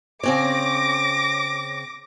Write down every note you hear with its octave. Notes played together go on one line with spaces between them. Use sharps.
C#3 C4 C#5 D6 A#6